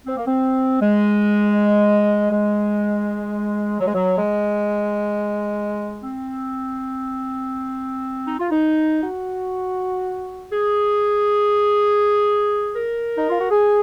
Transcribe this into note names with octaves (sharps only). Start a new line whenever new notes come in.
C4
A#3
C4
G#3
G#3
F#3
G#3
F#3
G#3
C4
D#4
F4
D#4
F#4
G#4
A#4
D#4
F4
F#4
G#4